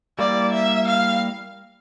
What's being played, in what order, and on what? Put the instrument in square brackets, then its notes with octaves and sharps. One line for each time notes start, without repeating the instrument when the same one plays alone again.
[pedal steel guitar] G3 A#3 E4 [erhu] D5
[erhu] E5
F5